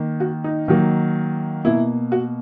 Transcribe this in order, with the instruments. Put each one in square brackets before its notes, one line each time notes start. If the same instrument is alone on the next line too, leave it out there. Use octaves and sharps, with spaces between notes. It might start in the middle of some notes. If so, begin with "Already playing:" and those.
Already playing: [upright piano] D#3 A#3
F#4
D#4
D#3 F#3 A#3
B2 A#3 E4
F#4